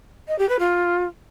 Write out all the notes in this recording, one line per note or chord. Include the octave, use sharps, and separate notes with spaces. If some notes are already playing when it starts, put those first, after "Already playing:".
D#5
G4
B4
F4